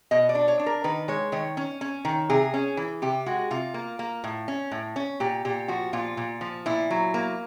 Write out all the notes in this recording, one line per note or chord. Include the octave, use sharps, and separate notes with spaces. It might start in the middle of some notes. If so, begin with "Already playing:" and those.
B2 D#5
D5
D4
C#5
D4
A#4
D#3 B4
G#3 C#5
D#3 C#5
C#4
C#4
D#3
C3 G#4
C#4
E3
C3 G4
G#3 F#4
C3 F4
A#3
A#3
A2
C#4
A2
C#4
A#2 G4
A#2 G4
F3 F#4
A#2 F4
A#2
F3
A#2 E4
F#3
A#3